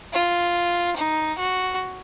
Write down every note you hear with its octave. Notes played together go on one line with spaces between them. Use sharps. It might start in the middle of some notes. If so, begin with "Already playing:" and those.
F4
D#4
F#4